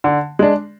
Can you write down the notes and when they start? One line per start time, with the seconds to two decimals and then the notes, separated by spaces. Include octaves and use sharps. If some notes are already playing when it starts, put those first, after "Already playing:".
0.04 D3
0.39 G#3 D4